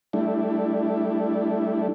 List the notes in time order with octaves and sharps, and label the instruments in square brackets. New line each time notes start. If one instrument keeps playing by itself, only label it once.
[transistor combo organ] G3 A3 D4 E4